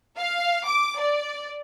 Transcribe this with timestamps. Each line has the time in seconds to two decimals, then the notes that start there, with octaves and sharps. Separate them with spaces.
0.17 F5
0.65 D6
0.99 D5